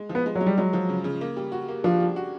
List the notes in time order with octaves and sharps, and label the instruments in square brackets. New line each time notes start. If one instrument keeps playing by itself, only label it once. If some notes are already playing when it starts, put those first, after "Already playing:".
Already playing: [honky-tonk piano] G#3
F3
[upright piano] B3
[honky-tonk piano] G#3
[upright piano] F#3
[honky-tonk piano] G#3
[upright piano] G3
[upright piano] F#3 [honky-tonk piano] G#3
[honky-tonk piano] F3
C#3
C#3
A#3
G3
F#4
A#3
[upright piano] F3 [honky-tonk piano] D4
[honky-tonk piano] G3
F#4